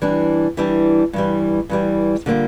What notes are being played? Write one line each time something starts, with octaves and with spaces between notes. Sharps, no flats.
E3 G3 D4
E3 G3 D4
G2 E3 G3
G2 E3 G3
D3 G3 A#3 F4